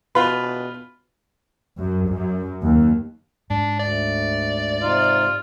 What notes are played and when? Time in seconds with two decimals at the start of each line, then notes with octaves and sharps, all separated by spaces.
0.15 B2 F4 B4
1.78 F#2
2.09 F#2
2.62 D#2
3.50 G#2 D4
3.80 D2 D5
4.82 C3 D#4 F4